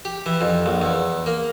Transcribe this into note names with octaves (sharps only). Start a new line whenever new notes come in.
G4
E3
F2
A#1
E2
A#3